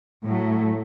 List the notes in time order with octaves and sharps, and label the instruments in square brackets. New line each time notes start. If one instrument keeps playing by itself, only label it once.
[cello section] A2 F#3 A3